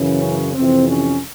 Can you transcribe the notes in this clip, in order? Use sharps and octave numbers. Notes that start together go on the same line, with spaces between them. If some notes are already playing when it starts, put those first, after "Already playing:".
Already playing: F#2 C#3 E3
C#4
F2 C3 E3 C4
C#4